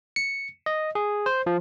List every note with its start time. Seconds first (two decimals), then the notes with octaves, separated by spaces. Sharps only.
0.16 C#7
0.66 D#5
0.95 G#4
1.26 C5
1.46 F3